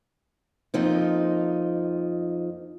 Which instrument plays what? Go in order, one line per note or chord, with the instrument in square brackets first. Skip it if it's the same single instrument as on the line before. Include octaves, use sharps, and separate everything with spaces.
[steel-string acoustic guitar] F2 F3 A#3 D#4